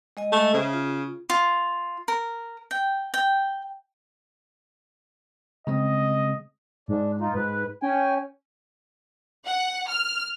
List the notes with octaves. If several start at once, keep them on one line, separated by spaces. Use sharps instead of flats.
G#3 D#5 G#5
A3
C#3 C5 E5
F4
F4
A#4
G5
G5
C#3 G#3 C4 D#5
G#2 D4
D#4 F4
G#2 B4
C#4 G5 G#5
F#5
F6